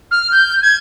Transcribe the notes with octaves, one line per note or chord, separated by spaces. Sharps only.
F6
G6
G#6